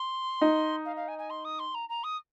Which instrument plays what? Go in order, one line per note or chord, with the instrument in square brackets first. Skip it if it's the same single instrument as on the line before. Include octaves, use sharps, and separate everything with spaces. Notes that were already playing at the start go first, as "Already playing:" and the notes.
Already playing: [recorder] C6
[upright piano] D#4
[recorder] F5
F5
G#5
G#5
C6
D#6
C6
A#5
A#5
D#6